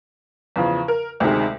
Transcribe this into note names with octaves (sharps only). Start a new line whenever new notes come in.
E2 C#3 F3
A#4
D2 C3 D#3 G#3